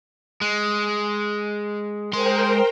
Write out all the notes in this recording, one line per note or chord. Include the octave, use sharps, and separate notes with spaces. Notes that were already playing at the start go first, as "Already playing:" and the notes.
G#3
G#3 A#4 C5 G5 C6